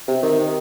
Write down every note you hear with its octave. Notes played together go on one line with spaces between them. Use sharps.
C3
D#3